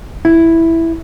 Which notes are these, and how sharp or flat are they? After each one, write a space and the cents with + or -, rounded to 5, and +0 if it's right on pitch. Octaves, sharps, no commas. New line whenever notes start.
E4 +0